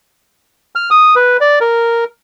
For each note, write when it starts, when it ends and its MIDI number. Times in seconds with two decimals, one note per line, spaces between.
0.75 0.90 89
0.91 1.15 87
1.16 1.37 71
1.41 1.59 74
1.61 2.04 70